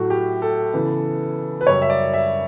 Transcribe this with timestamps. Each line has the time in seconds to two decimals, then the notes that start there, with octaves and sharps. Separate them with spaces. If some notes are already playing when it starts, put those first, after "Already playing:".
Already playing: A2 F#3 A3 F#4
0.10 G4
0.42 A4
0.73 C#3 E3 B3
1.61 B4
1.67 F#2 C#3 G3 C#5
1.82 E5
1.90 D5
2.13 E5